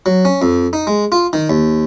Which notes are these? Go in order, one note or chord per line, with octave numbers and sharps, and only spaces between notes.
F#3
C#4
F2
D#4
G#3
F4
D#3
D#2